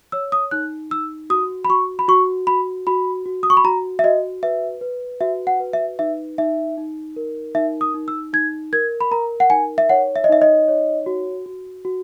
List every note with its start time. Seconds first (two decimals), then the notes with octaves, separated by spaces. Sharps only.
0.12 C#5 E6
0.32 D#6
0.51 D#4 F#6
0.90 D#4 E6
1.30 F#4 D#6
1.65 B5
1.69 F#4 C#6
1.99 B5
2.08 F#4 C#6
2.47 F#4 B5
2.87 F#4 B5
3.26 F#4
3.43 D#6
3.50 C#6
3.57 B5
3.64 F#4 A#5
3.99 E5
4.04 F#4 D#5
4.43 B4 E5
4.81 B4
5.20 F#4 E5
5.47 F#5
5.60 B4
5.73 E5
5.99 D#4 E5
6.38 D#4 E5
6.77 D#4
7.16 A#4
7.55 D#4 E5
7.81 D#6
7.94 D#4
8.08 E6
8.33 D#4 G#6
8.73 A#4 G#6
9.01 B5
9.11 A#4 A#5
9.40 F#5
9.50 D#4 G#5
9.78 E5
9.89 C#5 F#5
10.16 E5
10.24 D#5
10.29 D#4 E5
10.42 D#5
10.68 C#5
11.06 F#4
11.46 F#4
11.85 F#4